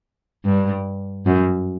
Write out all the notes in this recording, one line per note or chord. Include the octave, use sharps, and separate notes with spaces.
G2
F#2